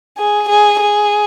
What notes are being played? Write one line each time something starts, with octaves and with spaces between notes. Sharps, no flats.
G#4
G#4
G#4